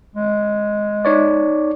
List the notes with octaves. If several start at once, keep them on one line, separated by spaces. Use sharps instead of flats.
G#3
D#4 C#5 D5